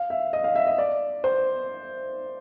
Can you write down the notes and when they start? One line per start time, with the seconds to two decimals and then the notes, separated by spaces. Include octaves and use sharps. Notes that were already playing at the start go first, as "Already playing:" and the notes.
Already playing: F5
0.10 E5
0.33 D#5
0.44 F5
0.55 E5
0.67 D#5
0.78 D5
1.24 C5